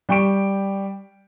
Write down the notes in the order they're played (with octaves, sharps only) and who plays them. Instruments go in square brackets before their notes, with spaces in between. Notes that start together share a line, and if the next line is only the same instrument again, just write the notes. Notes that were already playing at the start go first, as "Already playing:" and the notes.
[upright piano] G3 G5 C#6 D7